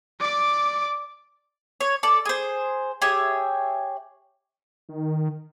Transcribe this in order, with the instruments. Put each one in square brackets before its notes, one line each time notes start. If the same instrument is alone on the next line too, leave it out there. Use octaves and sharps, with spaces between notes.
[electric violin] D5 D6
[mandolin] C#5
A4 D5
G#4 C5
G4 G#4 C#5 E5
[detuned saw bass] D#3